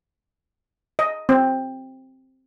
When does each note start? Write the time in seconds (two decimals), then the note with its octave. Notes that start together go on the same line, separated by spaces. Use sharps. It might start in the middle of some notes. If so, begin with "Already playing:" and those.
0.99 D#5
1.29 C4